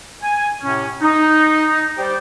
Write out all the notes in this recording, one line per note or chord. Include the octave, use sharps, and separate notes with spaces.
G#5
A2 C3 C#4
D#4
G3 G4 C5 D5 G5